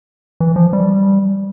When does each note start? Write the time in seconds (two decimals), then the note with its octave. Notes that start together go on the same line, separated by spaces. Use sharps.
0.40 E3
0.56 F3
0.73 G3